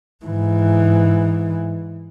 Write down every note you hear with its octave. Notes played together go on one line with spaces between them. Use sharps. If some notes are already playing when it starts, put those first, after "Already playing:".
G#2 E3